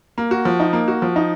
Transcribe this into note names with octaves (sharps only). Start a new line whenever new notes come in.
A#3
F#4
F3
D#4
A#3
F#4
F3
D#4